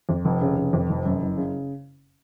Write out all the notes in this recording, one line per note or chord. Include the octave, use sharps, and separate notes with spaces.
F2
F1
C#3
F1
F2
F1
F#2
F#1
C#3